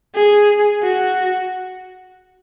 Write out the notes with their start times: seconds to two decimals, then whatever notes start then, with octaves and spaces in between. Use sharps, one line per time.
0.15 G#4
0.83 F#4